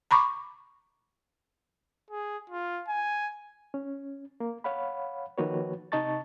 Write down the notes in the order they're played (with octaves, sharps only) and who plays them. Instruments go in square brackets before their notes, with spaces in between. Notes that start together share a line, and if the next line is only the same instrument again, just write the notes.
[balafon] A#5 B5 C#6 D6
[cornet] G#4
F4
G#5
[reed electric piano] C#4
A#3
C#5 F5 F#5 B5
D#3 F3 A#3 F#4 B4 C#5
C3 D#4 D#5 A5 C#6 A6